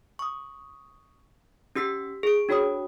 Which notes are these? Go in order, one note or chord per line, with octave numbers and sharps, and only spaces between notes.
C#6 D#6
C#4 G4 E6 B6 C7
G#4 D7
D4 F#4 C#5 B5 D#6